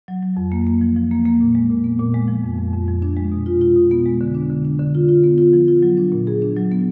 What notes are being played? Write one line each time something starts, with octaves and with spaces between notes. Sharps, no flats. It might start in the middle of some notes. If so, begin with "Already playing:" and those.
F#3
F#3
F2
A#3
A#3
F3
F3
A#3
A#3
A#2
G#3
A#2
B3
A#2
G#3
F3
F2
F2
F2
F3
D4
G#3
B2
F4
F4
B2
B3
G#3
D3
D4
D3
D4
D3
F4
F4
B3
F4
F3
F4
F#3
D4
A#2
G#4
D4
F#3
B3